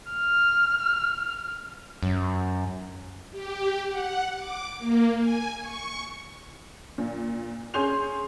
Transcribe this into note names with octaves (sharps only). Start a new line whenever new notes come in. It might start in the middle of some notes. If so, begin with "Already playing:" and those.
F6
F#2
G4
F#5
D6
A#3
G#5
C#6
A#2
C#4 G#4 G#5 C6 G6 F7